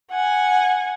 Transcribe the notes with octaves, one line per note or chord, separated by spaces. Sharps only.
F#5 G#5